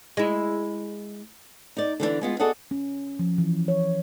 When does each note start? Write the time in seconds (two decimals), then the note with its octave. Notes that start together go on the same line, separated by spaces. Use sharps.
0.17 G#3 E4
1.77 D#4 D5
2.00 D3 E3 G3 D4
2.21 G#3 B3 F4
2.40 F#4 G#4 A4 D5 D#5 F#5
2.71 C#4
3.19 F3
3.38 E3
3.68 C#5